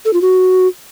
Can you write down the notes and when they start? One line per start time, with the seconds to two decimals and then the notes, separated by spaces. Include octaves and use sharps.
0.05 A4
0.13 F4
0.22 F#4